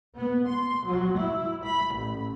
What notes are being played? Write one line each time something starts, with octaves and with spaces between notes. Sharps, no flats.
B3
C6
F#3
E4
B5
A1